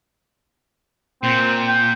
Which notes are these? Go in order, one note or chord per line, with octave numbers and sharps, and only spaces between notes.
A#2 C4
G5